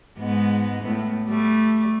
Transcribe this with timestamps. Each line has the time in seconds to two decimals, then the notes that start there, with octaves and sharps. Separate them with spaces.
0.18 G#2 G#3 B3
0.82 A2 B3
1.27 G3 A3